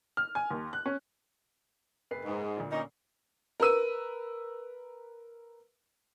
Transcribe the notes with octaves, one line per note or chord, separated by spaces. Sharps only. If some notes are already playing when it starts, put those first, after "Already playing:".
F6
G#5
D#2
F#6
C#4
F#1 B4 C7
G#2
D2 A#2
A#3 C#4 D#4
A#4 B4 E6 D#7